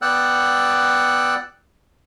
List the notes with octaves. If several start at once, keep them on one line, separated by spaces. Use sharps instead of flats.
B3 D5 F#5 G5 E6 F#6